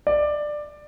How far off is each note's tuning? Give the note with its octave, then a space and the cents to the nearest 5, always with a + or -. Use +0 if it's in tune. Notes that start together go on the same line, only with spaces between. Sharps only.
D5 +15